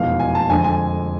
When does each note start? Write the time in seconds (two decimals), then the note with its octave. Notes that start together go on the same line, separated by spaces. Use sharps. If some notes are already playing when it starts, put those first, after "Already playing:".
Already playing: F1 E2 B2 G#3 F5
0.20 G#5
0.35 A5
0.49 F2 D3 G#3 G#5
0.64 G#5